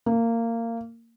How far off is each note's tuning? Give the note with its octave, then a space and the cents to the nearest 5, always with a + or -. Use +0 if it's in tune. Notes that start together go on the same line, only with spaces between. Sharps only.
A#3 -20